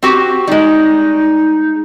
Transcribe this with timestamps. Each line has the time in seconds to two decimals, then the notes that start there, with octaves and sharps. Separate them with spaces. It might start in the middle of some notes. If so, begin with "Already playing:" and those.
0.03 C4 F#4 G4
0.47 G3 G#3 D#4